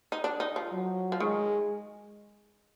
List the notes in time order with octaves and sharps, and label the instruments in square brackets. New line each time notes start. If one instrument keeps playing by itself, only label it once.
[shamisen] D#4
D4
D#4
F3
[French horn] F#3
[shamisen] F3
[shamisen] D#3 [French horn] G#3